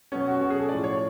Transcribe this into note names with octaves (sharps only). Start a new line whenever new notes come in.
B2 F#3 C#4
F#4
B2 F#3 F#4
G#4
A4
A2 F3 D5
C#5